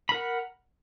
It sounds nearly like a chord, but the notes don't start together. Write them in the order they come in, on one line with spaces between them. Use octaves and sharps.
B5 A#4 F#5